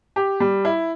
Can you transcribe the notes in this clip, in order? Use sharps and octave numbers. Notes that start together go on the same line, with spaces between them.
G4
G3
E4